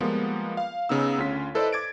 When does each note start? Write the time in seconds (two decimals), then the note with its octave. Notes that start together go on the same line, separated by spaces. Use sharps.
0.01 F3 G3 G#3 A#3 B3
0.57 F5
0.89 C#3 B3 D#4 E6
1.18 D2 C#4 F4 B6
1.55 E4 A4 B4 C5 D5 D#5
1.72 D6 G#6 A6 D7